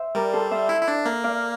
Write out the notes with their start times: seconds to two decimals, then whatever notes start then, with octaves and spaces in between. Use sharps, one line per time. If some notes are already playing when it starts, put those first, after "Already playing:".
Already playing: C5 E5
0.15 G3 A#4 D5
0.33 A4 C5
0.51 C5 E5
0.69 E4
0.81 E4
0.88 D4
1.05 A#3
1.24 D5 F5